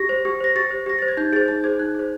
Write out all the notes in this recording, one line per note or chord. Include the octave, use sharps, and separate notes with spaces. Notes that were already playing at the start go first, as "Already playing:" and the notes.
Already playing: G4 A#6
C5
G4
C5 A#6
G4 A6
C5
G4 A#6
C5 A6
G#6
D#4 G6
G#4 C5 A6
D#4 A6
G#4 C5 G#6
D#4 F#6
G#4 C5